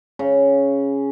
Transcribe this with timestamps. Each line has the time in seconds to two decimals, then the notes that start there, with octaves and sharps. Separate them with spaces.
0.19 C#3